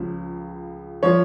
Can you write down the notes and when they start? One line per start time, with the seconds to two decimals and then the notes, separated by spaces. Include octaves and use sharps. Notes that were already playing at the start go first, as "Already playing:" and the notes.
Already playing: C#2 C#3 F3
1.03 F3 C#5